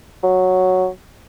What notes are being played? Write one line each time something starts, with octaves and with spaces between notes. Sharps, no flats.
F#3